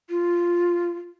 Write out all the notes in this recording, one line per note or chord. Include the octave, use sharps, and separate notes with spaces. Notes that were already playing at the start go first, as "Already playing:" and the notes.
F4